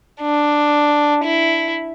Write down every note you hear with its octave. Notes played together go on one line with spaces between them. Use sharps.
D4
E4